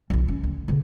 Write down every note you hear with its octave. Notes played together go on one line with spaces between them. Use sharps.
B1 F2
C#4
D2
B2 D3